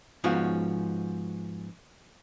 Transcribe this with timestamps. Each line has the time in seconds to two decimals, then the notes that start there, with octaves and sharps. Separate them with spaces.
0.24 G#2 F3 B3 C#4 F4 F#4